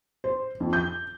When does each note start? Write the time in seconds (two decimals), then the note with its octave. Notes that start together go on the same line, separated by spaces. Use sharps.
0.24 C5
0.60 F2
0.73 G6